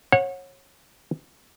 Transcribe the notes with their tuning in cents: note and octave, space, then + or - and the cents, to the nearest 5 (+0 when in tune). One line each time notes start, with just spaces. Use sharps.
C#5 -25 F#5 -25